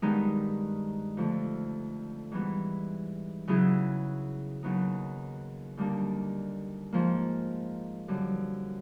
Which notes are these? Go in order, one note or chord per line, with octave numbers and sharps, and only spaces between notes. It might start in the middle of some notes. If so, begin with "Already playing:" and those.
G2 D#3 G#3 B3 D#4
F2 D3 F3 A3
G#2 E3 G3 B3
C#3 F#3 B3 E4 G#4
D#2 C#3 F#3 B3 D#4
D#2 D3 G3 A#3 D4
G#2 F3 A#3
F#2 D3 G3